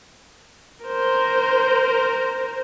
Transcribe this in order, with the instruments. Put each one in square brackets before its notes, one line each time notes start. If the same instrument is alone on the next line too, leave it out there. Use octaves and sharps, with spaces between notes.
[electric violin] A#4 C5